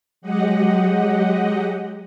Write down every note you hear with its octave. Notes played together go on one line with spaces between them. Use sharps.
F#3 G#3 G4 D#5 F#5